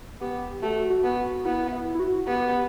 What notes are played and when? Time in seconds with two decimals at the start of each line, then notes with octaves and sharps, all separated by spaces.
0.21 B3 G4
0.62 A3 F#4
0.90 F#4
1.04 B3
1.17 F#4
1.45 B3 E4
1.72 E4
1.95 E4
2.00 F#4
2.27 B3 G4